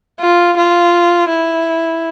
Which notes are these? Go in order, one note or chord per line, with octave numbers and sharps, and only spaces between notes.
F4
F4
E4